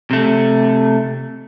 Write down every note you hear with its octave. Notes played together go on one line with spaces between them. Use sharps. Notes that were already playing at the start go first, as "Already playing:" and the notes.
C3 A3